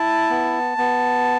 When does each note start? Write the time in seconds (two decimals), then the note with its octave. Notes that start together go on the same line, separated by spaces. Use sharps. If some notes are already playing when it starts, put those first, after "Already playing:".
Already playing: E4 A5
0.30 B3
0.78 B3